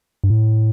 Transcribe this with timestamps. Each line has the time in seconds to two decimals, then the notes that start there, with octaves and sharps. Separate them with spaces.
0.24 G2
0.30 A2